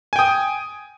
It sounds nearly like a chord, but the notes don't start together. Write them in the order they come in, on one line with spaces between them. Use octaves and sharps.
G#5 G5 D#6